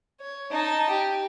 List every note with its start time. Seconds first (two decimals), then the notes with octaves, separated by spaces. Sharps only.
0.21 C#5
0.51 D#4 A5
0.90 G4